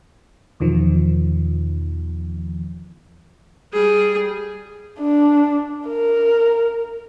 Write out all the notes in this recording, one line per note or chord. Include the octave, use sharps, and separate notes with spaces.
E2 B2 D#3 F3
G3 G#4
D4
A#4